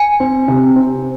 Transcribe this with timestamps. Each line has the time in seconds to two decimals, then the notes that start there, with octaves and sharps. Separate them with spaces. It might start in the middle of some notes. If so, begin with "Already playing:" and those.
Already playing: G#5
0.20 C4
0.48 C3
0.76 C4